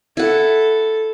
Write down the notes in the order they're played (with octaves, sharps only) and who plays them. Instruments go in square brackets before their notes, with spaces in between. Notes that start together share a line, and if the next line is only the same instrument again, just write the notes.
[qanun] E4 F#5 [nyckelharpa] A4